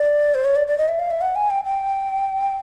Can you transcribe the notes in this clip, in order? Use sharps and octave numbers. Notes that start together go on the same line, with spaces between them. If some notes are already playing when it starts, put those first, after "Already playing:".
Already playing: D5
C5
C#5
D5
D5
D#5
E5
F5
E5
F#5
G#5
G5
G5